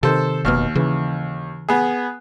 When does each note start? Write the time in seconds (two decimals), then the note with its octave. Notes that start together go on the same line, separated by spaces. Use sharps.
0.03 C3 D#3 A4 C5
0.45 F1 D#2 B2 F6
0.75 C#3 E3
1.69 B3 G#4